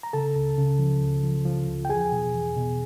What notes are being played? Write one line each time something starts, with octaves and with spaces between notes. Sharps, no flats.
A#5
C#3 A4 A5
C#2
C#3
F3
C#2
F3
F3
C#2
G5
E2 G#4 G#5
B2
E2
B2